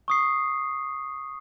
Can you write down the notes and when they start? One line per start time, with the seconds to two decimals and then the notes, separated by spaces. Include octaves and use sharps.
0.08 C#6 D#6 C7